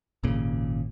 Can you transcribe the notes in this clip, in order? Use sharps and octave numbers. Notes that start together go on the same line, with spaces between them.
G#1 D#2 A#2 C#3